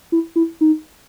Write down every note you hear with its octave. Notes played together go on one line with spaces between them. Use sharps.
E4
E4
D#4